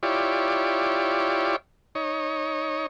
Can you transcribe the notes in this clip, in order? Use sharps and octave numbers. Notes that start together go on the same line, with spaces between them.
E4 F4 G4 C#5 D5
D#4 C#5